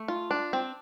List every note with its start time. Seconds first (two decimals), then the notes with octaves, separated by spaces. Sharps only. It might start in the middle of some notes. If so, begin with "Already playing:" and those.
Already playing: A3
0.08 F4
0.31 D4
0.53 C4